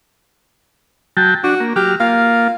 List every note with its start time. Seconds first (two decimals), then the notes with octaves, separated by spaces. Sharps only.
1.17 F#3 G5 A5
1.44 D4 F#4
1.60 A#3
1.76 F#3 G4 F6
2.00 A#3 F4 F5